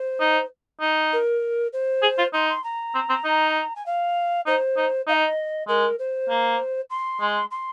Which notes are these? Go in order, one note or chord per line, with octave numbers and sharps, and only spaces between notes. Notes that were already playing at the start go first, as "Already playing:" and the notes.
Already playing: C5
D#4
D#4
A#4
C5
G#4
F4
D#4 C6
C6
A#5
C4
C4
D#4
G#5
F5
D#4 C5
D#4
D#4 F5
D#5
G#3 A#4
C5
A#3
C6
G#3
C6